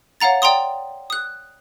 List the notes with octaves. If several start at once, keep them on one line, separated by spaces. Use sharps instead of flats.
C#5 F5 F#5 A#5 A6
D5 G5 A#5 C6 D#6
D#6 F#6